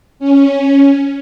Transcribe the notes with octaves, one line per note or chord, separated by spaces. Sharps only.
C#4